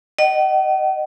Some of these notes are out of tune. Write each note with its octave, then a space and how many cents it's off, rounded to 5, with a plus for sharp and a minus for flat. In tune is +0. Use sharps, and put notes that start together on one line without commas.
D#5 -30 F#5 +45